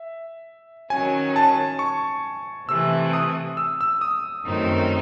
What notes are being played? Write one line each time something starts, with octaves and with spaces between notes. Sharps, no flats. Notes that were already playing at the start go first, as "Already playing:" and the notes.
Already playing: E5
D#3 F#3 C#4 G#5
A5
C#6
C3 E3 A3 E6
D#6
E6
E6
D#6
F#2 D#3 A3 C4 D#4